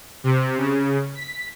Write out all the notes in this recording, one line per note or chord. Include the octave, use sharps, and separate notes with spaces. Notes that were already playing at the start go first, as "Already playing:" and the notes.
C3
C#3
B6